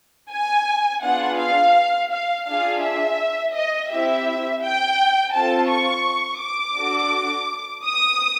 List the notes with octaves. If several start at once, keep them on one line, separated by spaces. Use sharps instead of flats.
G#5
B3 D4 F4 G#4 F#5
F5
F5
D4 F4 G#4 F5
E5
D#5
C4 E4 G4 E5
G5
C4 F4 A4 A5
C#6
D6
D4 F#4 A4
D#6